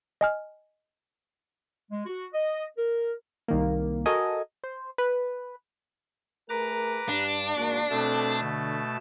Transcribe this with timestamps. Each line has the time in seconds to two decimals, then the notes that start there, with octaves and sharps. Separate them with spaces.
0.21 D#5 G#5 F6
1.91 G#3
2.06 F#4
2.33 D#5
2.78 A#4
3.48 C2 D#3 A#3
4.06 F#4 A4 A#4 D#5 G#5
4.64 C5
4.98 B4
6.49 A3 G#4 A#4 B4 A#5 D6
7.09 G2 D4
7.55 E2 G#2 A#3 F#4
7.90 B2 A3 C4 A4 A5
8.42 D3